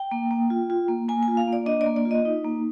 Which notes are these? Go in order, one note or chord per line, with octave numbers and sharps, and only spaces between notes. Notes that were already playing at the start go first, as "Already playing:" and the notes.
Already playing: G5
A#3
A#3
F4
F4
A#3
A#3 G#5
G#5
F4
F5
A#3 D5
D4 D#5
A#3 D5
D5
F4
D#5
D#4
A#3